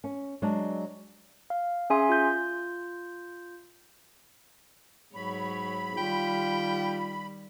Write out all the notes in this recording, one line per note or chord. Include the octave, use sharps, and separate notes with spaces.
C#4
F#3 G#3 D4
F5
C#4 G#4 E5 G#5 C6
F4 G6
G#2 F#3 C#5 B5
D#3 G3 F4 G5